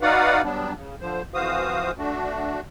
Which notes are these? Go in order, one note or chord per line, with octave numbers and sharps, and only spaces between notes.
D#4 F#4 B4 D5 F5 F#5
F#3 G3 B3 D4
C#3
D3 F3 C5
F2 E3 F#4 C5 F5 D#6
A3 D4 F#4